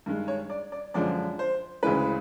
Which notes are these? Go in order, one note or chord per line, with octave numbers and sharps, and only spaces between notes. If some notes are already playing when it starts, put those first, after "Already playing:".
G2 D#3 G#3
C#5
D5
D5
F#2 D3 F3 G#3 D5
C5
D2 C#3 E3 G#3 B4